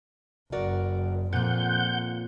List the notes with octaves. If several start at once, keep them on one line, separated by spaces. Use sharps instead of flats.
F#1 F#4 A#4 D5
F2 A#2 F4 F#5 G6